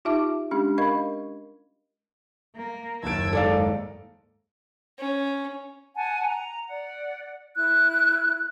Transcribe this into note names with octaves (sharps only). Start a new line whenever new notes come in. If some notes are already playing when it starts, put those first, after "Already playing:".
D#4 F4 G4 E5 A5 D6
G#3 C#4 D4 G4
A#4 D#5 F5 B5 C#6 G#6
A#3
F#1 D#2 A5 E6 G#6 D7
G#2 A4 D5 F5
C#4
F#5 G#5 A5
A#5
D5 F#5
E4 F#6